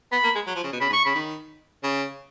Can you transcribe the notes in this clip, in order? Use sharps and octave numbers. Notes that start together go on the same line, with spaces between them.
B3 B5
A#3
G#3
F#3
F3
C#3
B2
C#3 B5
G#2
C#6
C#3 B5
D#3
C#3